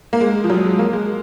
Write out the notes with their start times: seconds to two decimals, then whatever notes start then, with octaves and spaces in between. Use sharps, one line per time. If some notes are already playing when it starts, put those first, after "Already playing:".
0.13 A#3
0.21 G#3
0.44 F3
0.50 F#3
0.64 G#3
0.79 A#3
0.93 G#3